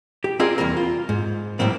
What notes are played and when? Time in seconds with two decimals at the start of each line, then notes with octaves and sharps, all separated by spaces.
0.24 G4
0.40 C4 F4 G#4 A#4 D5
0.58 E2 C#3 G3 A#3 A#4
0.77 F4
1.09 G#2
1.59 A2 F#3 G3 A#3 C4